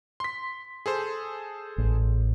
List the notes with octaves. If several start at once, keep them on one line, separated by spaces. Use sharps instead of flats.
C6 B6
G#4 A4 C5
A1